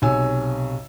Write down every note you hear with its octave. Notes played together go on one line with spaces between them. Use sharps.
B1 C3 C#5 G#5 E6